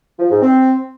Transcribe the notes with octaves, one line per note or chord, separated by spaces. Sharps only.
F3
G#2
C4